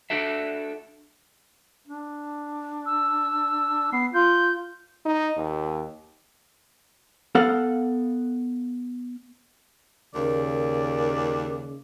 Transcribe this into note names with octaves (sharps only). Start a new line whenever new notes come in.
D4 F#4 A4 E5
D4
E6
B3 C7
F4 G6
D#4
D#2
B3 A4 F5 F#5
D#2 C#3 A#4 D5